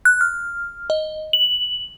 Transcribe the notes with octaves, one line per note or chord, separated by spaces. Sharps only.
F#6
F6
D#5
F#7